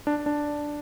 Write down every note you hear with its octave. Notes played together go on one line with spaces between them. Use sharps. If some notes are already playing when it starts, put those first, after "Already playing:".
D4
D4